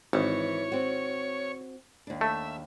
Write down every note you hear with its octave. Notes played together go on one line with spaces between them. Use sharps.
G#1 E3 C#5
C4 F#4
D#2 D4
A3 E5